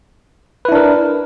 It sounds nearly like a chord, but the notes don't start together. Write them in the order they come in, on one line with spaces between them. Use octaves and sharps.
B4 E4 D4 A#4